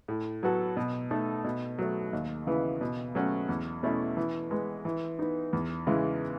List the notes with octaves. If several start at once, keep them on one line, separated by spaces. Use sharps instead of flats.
A2
F#3 B3 F#4 A4
B2
A3 D#4 A4
B2
F#3 A3
D#2
C#3 E3 B3
B2
F#3 A3 C#4 F#4
E2
B2 A3 C#4 E4
E3
G#3 B3
E3
B3 D#4
E2
C#3 E3 G#3